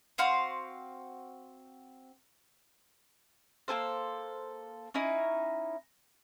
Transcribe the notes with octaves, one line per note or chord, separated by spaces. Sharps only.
C4 F#4 F5 C6
A#3 G#4 A4 C5
C#4 D#4 E4